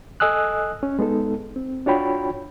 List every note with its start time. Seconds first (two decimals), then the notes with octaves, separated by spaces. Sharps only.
0.20 A4 D#5 G#5 D#6 E6 F#6
0.83 C#4
0.99 G#3 B3 D#4 A4
1.56 C4
1.86 D4 F4 F#4 C#5 G5 B5